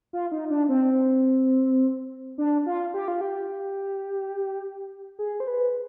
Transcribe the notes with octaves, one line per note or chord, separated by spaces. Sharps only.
F4
D#4
D4
C4
D4
F4
G4
F4
G4
G#4
C5
B4